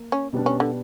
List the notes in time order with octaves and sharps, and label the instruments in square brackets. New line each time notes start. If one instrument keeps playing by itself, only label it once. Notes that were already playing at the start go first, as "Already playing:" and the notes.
Already playing: [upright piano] A#3
[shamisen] C#4
[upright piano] B2 G3 B3 D4
[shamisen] C#4
D3